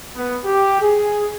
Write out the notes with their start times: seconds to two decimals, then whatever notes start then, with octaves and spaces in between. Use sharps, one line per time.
0.16 B3
0.45 G4
0.81 G#4